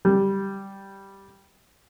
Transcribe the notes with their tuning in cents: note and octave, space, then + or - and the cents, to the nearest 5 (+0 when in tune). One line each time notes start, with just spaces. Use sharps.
G3 +0